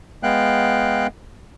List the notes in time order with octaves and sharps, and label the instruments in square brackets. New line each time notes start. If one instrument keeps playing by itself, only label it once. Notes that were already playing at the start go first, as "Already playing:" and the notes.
[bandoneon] G#3 B3 F5 G5 F#6